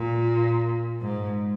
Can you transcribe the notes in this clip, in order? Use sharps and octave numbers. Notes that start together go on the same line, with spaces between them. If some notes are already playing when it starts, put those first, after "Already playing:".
Already playing: A#2
G#2